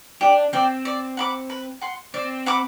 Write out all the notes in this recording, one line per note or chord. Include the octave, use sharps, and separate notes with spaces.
D4 G4
C4 D5 G5
D5
F#5 B5 D6
B4
F#5 C6
C4 D5
F#5 B5 D6